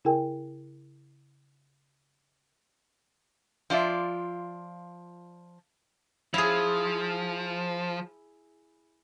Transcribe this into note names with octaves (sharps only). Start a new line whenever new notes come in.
C#3 E4 G#4 A#4 G5 G#5
F3 F4 D5 E5
F3 E4 G#4